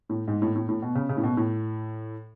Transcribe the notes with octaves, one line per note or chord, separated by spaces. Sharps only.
A2
G#2
A2
A2
A2
B2
C#3
C#3
A2
B2
A2